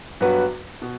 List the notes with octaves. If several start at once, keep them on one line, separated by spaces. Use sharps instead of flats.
G2 F#3 B3 F#4 B4
B2